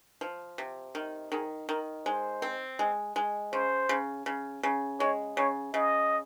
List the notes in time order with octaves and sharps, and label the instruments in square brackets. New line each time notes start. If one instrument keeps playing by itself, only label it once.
[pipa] F3
C3
D#3
[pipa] D#3 [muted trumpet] G#4
[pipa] D#3 [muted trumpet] A#4
[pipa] G#3 [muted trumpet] C5
[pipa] C4
G#3
G#3
[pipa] C#3 [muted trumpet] C5
[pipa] C#3
C#3
C#3
[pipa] G#3 [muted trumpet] C#5
[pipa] C#3 [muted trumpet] C#5
[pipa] C#3 [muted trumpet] D#5